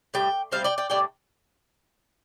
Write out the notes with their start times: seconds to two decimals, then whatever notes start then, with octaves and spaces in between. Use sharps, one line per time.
0.14 A2 G3 G5
0.52 A2 G3 C4 C5 F5
0.64 D5 G5
0.78 D5 G5
0.90 A2 G3 D4 D5 G5